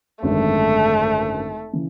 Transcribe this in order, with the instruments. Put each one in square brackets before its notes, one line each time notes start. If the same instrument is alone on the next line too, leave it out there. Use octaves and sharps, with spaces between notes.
[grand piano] G#1 F#2 D3 G#3 [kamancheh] A3
[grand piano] C#3 E3